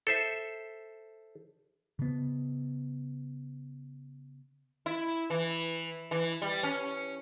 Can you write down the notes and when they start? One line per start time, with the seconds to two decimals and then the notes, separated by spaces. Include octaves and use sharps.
0.07 A4 C5 E5
1.99 C#3 B3
4.86 E4
5.30 E3
6.11 E3
6.42 G3
6.63 C#4